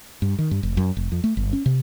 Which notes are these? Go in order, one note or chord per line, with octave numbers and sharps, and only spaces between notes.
G2
D#3
G2
F1
F#2
F1
F2
A3
G1
C#4
C3